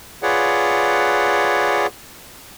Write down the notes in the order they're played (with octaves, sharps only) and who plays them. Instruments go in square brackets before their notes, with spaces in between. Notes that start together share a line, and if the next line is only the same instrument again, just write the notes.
[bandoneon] F4 G#4 B4 C#5 D5 F#5